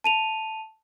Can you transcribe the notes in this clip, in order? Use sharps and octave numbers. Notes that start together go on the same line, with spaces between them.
A5 D#7 F7